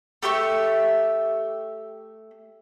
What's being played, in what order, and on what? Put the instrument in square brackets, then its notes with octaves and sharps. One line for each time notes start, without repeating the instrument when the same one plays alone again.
[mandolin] A3 G4 E5 C#6